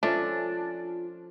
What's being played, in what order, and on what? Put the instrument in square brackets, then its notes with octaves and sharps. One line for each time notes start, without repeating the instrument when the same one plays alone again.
[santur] F3 G#5 E6 [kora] C#4 A4 E5 [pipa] D4 [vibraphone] F4